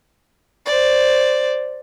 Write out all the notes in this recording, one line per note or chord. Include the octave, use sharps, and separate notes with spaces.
C5 D5